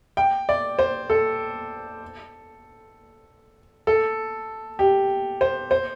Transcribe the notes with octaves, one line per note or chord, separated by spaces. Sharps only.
G5
D5
C5
A4
A4
G4
C5
C5